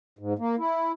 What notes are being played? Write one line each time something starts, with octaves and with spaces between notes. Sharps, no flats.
G#2
A#3
E4